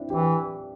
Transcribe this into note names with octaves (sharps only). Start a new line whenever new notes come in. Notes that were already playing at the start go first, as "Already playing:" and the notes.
Already playing: C4 D4 E4
E3 G4